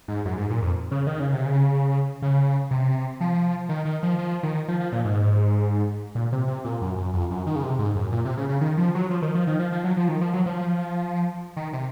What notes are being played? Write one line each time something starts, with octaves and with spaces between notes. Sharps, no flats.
G#2
F#2
G#2
A#2
F2
C#3
D#3
C#3
C3
C#3
C#3
C3
F3
D#3
D#3
F3
F3
D#3
F3
F3
A#2
G#2
A#2
C3
C3
A#2
F#2
F#2
F2
F#2
D#3
C#3
C3
G#2
F#2
A#2
C3
C#3
C#3
D#3
F3
F#3
F3
D#3
F3
D#3
F3
F3
F#3
F3
D#3
F3
F#3
F3
D#3
C3